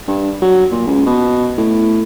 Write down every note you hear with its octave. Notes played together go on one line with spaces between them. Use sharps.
G2
F#3
A#2
C#2
B2
A2